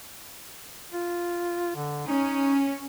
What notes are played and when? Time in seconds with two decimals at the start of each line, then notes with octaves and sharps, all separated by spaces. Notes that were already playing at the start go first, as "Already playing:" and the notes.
0.91 F4
1.75 D3
2.07 C#4 D#4